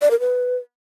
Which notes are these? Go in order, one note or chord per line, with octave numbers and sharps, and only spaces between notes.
D5
A#4
B4